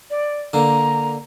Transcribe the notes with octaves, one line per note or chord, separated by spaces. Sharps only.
D5
D3 A#3 A#5